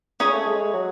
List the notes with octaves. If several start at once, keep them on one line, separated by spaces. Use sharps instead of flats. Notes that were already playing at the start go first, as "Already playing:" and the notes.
C#4 G#4 C#5
A3
G#3
F#3